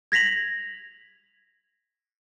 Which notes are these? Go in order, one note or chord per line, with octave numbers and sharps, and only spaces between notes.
G#6 A#6 B6 F7 F#7